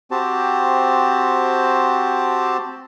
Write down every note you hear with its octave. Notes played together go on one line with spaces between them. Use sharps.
C4 F#4 G4 C5 A5